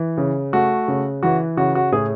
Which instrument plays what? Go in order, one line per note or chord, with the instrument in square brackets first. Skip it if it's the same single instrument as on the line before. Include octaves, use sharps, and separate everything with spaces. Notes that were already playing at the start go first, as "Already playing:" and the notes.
Already playing: [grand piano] E3
C#3
A3 F#4
C#3
E3 F#4
C#3 F#4
F#4
A2 G#4